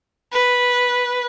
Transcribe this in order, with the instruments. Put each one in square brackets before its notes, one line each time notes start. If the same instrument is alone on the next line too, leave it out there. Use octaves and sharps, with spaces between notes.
[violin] B4